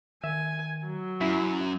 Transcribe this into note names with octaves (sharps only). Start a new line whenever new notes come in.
D#3 E5 G#5
F#3
F#2 C#4 E4